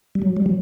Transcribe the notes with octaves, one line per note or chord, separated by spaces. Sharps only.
G3
F#3
G3
F#3